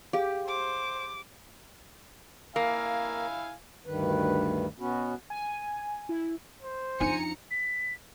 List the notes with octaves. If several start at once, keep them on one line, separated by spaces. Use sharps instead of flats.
G4 G#4 F5
C5 D6
A#3 E4 F5 G#5
D2 G2 D#3 B4
B2 B3 C#4 F#4 B4
G#5
E4
C5
F2 D4 D#4 G#5 A#5 C#7
B6